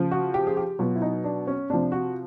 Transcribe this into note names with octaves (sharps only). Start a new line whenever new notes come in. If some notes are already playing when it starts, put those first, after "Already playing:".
Already playing: C#3 F3
F#4
G4
G#4
G4
B2 F#3 F4
E4
D#4
D4
C#4
C3 F3 D4
F#4